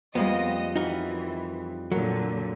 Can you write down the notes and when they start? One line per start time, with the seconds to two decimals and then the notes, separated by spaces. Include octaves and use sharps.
0.15 F2 G3 G#3 A#3 B3 D#5
0.76 E3 D#4 F#4 A#4
1.92 A#2 D3 F#3 A#4